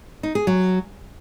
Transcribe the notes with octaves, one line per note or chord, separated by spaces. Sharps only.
D#4
G#4
F#3